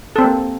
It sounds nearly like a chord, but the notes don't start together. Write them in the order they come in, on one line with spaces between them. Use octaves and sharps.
A4 C4 C5 A#3